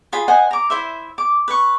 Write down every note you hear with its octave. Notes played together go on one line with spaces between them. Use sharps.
F4 G#4 B5
C5 D#5 F#5 G#5
A#5 D6
E4 C5 E5
D6
B4 C#6